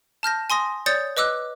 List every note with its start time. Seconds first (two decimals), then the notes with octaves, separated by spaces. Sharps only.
0.23 A5 F6 G6 A#6
0.50 G#5 C6 D#6 A#6
0.86 C#5 D5 D#6 G6 A6 C#7
1.17 B4 D#5 D6 E6 F#6